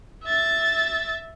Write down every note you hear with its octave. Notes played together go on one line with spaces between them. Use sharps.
E5 A6